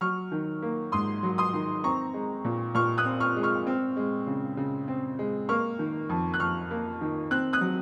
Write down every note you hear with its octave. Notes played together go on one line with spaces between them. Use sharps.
F#3 C#6 F6
D#3
A#3
G#2 C6 D#6
F#3
C6 D#6
D#3
C4 A#5 C#6
G#3
A#2
A#2 C#6 F6
D#6 F#6
C4
C#6 F6
G#3
C#6 F6
C4
G#3
C#3
C#3
C4
G#3
A#3 C#6 F6
D#3
F2
F#6
F2 C#6 F6
A#3
D#3
C4 F#6
D#6 F#6
F#3